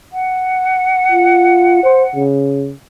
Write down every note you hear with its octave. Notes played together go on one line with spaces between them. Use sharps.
F#5
F4
C5
C#3